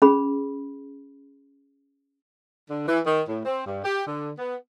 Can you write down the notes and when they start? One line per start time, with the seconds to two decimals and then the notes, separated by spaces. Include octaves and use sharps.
0.02 C#4 G#4 B5
2.69 D3
2.87 E3
3.06 D#3
3.28 A2
3.45 C4
3.66 G2
3.84 G4
4.07 D3
4.38 B3